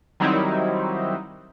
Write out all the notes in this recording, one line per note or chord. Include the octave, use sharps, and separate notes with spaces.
D#3 F#3 G3 C4 D#4 E4